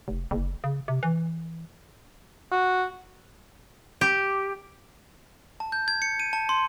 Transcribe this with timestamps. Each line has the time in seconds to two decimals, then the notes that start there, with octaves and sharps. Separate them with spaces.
0.08 F1
0.31 F#1
0.64 C#3
0.88 C3
1.03 E3
2.52 F#4
4.01 G4
5.60 A5
5.72 G6
5.88 G#6
6.02 C#7
6.20 D#7
6.33 A5
6.49 C6